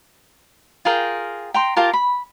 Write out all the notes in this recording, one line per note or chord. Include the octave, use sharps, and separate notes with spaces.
F4 G#4 A#4 G5
G5 A#5 C6
F4 G4 A#4 A5
B5